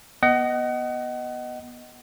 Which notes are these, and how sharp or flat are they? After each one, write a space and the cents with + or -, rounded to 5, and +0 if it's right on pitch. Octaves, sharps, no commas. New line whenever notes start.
B3 -20 D#5 +0 F#5 +30